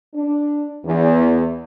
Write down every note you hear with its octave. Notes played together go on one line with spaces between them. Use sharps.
D4
E2